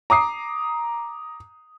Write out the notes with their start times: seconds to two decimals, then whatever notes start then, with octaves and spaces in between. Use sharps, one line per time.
0.10 A#5 D6 D#6 C7